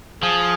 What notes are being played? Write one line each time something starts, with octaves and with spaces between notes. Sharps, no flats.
F3 G#4